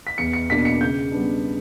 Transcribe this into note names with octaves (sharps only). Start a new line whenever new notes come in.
B6
E2 C#7
C#7
B2 A#3 D4 B6
C#7
C#3 G6
G3 B3 D4